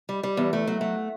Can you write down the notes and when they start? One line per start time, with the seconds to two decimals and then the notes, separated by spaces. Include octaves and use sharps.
0.09 G3
0.23 G3
0.37 E2
0.53 A3
0.67 F#3
0.81 A3